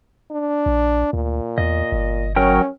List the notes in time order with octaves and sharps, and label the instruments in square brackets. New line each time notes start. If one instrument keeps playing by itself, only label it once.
[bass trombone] D4
[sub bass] A#1
[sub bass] D2 [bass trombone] A#2
[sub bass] E2 [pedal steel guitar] D#5
[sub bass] G1
[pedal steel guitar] F#3 A#4 G5 [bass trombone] C#4